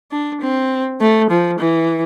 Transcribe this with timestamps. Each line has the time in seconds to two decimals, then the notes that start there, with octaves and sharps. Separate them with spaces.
0.12 D4
0.41 C4
1.01 A3
1.30 F3
1.59 E3